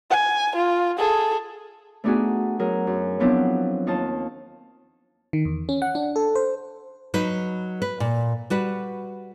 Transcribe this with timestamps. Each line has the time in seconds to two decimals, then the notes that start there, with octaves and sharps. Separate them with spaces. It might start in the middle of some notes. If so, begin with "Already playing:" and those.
0.10 G#5
0.55 F4
0.98 G#4 A4
2.04 A3 B3 D4 D#4 F#4 G#4
2.59 F#3 G#4 A#4
2.87 F#2
3.20 F3 F#3 B3 C4 D4 E4
3.87 D#2 D#4 F4 A5
5.33 D#3
5.45 E2
5.69 C#4
5.82 F#5
5.95 D4
6.16 A4
6.35 C5
7.14 F#3 D#4 B4
7.82 B4
8.00 A#2
8.50 G3 F#4 B4